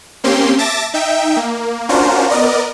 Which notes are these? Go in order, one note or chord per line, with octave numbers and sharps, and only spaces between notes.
A#3 C4 C#4 G4 C6
E5 A5 D6 A6 A#6
D#4 E5 G5
A#3
C#4 D4 F4 F#4 A#4 C5
B3 A#4 D5 D#5